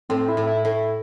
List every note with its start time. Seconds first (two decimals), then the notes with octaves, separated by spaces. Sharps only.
0.09 A2 C4
0.29 E4
0.37 A2
0.47 E4
0.65 A2 E4